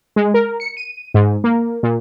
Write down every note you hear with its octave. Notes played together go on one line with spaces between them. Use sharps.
G#3
A#4
C#7
D#7
G#2
A#3
A#2